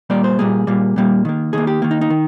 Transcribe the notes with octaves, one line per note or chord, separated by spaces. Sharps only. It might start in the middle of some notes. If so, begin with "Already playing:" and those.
A#2 G3 A#3 D5
C5
A#2 G3 A#3 G#4
A#2 G3 A#3
A#2 G3 A#3
D#3 A#3
D#3 A#3 G#4
G4
D#3 A#3
D#4
D#4
D#3